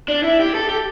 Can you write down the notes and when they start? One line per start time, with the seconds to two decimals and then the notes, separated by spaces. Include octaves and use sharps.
0.08 D4
0.23 E4
0.39 G4
0.54 A4
0.69 G4